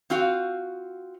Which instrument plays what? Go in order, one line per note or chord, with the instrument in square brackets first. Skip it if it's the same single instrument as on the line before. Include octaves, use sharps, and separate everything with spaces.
[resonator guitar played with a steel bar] C4 F4 F#4 F5